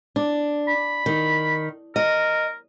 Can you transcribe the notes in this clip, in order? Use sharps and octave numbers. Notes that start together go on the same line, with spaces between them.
D4
B5
D#3
A#4 D#5